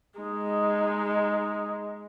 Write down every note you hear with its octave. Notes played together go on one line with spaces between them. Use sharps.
G#3 D#4